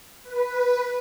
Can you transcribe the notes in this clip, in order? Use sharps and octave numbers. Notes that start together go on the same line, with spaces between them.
B4